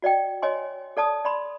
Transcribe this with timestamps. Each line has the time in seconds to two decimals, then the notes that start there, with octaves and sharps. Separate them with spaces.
0.02 F#4 D5 D#5 G5
0.42 C#5 D#5 G#5 C6
0.97 A4 D5 A5 D#6
1.25 D5 B5 C6